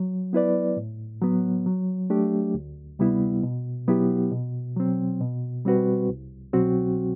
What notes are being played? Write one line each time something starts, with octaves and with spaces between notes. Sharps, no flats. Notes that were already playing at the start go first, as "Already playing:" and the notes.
Already playing: F#3
B3 E4 B4 D5
A2
F#3 B3
F#3
A3 D4 G4
D2
C3 G3 B3 E4
B2
F#3 B3 E4 G4
B2
F#3 C4
B2
G3 C4 F#4 B4
C2
B2 F#3 C4 F#4